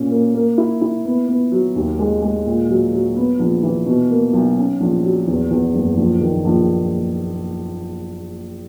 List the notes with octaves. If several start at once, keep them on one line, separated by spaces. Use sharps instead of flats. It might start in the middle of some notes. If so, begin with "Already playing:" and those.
Already playing: A#2 C#4
A#3
A#3
E4
E4
B3
B3
F#3
D#2
G#3
G#3
A#2
F#3
F#3
B3
A#1
E3
B2
A#3
B1
C#4
A#1
F#3
E2
E2
F#1
A#1
D#3
A#1